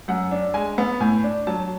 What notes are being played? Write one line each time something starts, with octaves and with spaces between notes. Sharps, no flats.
F#2 F#5
D4
G#3 G#5
B3
A2 G#5
D4
F#3 A5